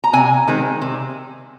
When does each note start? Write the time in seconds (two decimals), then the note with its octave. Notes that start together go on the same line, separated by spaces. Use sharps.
0.04 A#5
0.13 C3 G#5
0.48 D#3 G#3 C4
0.82 C3